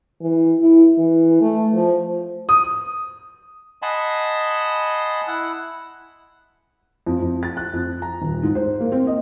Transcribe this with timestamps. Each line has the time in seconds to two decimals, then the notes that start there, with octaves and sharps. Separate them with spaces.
0.21 E3
0.60 E4
0.98 E3
1.41 A3
1.74 F3
2.49 D#6
3.82 D#5 F#5 G#5 A5 B5 C6
5.28 E4 F#5 E6 F#6
7.07 F2
7.22 F2
7.43 A6
7.57 F#6
7.73 F2
8.02 A#5
8.22 D#1
8.43 G#2
8.55 C5
8.80 A#3
8.92 C4
9.07 D#5